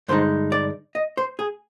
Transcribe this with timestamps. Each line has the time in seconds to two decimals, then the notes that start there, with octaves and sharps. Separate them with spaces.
0.08 G2 D3 G#3 D#4 C5
0.52 D5
0.95 D#5
1.17 C5
1.39 G#4